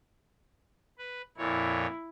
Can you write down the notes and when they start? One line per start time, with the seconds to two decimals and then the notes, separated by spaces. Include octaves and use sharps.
0.98 B4
1.37 F2 A#2 E4 C#5